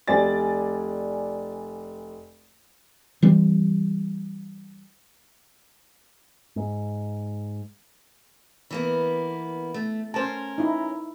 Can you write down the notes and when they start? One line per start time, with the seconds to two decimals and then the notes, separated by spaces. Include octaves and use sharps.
0.08 F1 D5 G#5 A6
3.22 E3 G3 C4
6.56 G#2
8.71 E3 A#3 B3
9.74 A3
10.14 C#4 A#4 C5 A5
10.58 D#4 E4